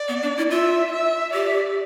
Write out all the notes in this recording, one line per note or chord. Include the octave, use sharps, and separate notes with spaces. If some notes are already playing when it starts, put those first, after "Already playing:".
Already playing: D5
B3
D4
E4
F4 E5
E5
G4 D5